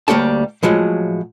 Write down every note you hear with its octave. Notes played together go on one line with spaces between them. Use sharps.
D2 G3 A#3 G4 C#5 A5
A2 F3 F#3 G#3